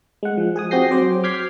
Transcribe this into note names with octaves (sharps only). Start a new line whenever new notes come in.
G#3 F#5
F3
G#4 G#5 D#6
C4 F#4 G4 G6 A#6 C7
F#3 C5 D6
D6 F6 G6 G#6 B6 C7